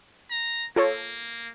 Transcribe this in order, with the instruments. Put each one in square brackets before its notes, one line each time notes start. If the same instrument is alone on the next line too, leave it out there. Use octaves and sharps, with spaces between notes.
[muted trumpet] A#5
[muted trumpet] A#3 [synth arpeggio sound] F4 A4 C#5